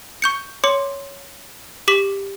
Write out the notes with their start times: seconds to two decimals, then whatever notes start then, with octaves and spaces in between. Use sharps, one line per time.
0.22 C#6 G6 C#7
0.64 C#5 C6 D6 C#7
1.88 G4 D6 B6 F#7